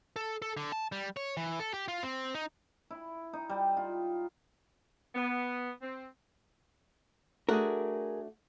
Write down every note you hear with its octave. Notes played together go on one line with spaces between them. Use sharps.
A4
A4
D3
A5
G3
C#5
E3
A4
G4
F4
C4
D#4
E4
D#4
G3
F4
B3
C4
A3 D4 F#4 G#4 A#4